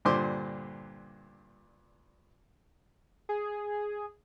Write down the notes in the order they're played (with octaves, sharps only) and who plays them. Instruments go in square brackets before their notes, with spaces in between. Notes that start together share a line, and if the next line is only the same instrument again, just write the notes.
[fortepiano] G2 A#2 D3 C5 C6 D6
[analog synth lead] G#4